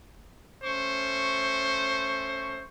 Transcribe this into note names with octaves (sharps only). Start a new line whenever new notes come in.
A3 C#4 C5 C#6